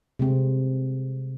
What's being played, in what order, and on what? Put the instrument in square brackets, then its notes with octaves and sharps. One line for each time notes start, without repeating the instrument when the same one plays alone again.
[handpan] C3 G#3 C4